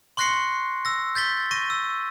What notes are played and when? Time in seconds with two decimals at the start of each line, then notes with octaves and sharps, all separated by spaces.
0.17 C6 C#6 F#6 A#6 C7 C#7
0.85 E6 A#6
1.15 G6 A6 B6 G7
1.51 C#6 A#6 D#7
1.70 E6